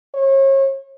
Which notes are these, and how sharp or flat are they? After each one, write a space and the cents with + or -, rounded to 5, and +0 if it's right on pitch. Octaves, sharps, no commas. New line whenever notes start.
C#5 -35